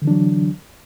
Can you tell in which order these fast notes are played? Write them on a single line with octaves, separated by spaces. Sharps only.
D3 E3 D4 F#3